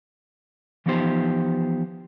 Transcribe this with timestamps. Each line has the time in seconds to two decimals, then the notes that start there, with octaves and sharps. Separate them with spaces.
0.86 E3 F3 B3 D#4 G4 C5